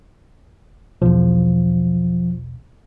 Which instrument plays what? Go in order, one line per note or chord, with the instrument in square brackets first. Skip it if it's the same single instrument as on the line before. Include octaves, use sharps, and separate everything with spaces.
[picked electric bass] B1 E2 [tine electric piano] F3